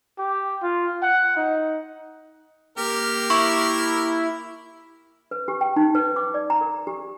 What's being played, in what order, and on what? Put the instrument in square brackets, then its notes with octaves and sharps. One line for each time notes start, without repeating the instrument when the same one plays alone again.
[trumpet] G4
F4
F#5
D#4
[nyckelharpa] A#3 G4 [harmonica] A#4
[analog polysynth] E4 [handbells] C#6
[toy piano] B4
G4
G5
D#4
B4
D6
D5
A#5
A#4
G4